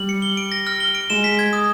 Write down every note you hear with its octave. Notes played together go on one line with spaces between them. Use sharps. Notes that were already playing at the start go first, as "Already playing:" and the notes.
Already playing: G3 F#7
C#7
G7
D7
A#6
F6
G7
D7
G#3 E7
B6
G#6
D#6